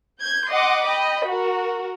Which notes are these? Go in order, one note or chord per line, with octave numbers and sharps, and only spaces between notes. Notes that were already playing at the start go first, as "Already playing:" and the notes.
G6 G#6
D#5 F#5 C6 D6
D#5 G5 B5
F#4 A#4